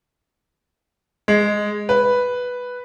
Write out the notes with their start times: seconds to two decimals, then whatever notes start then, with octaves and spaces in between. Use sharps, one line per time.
1.28 G#3
1.89 B4